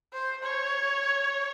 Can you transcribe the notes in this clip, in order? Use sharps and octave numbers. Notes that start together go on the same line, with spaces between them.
C5
C#5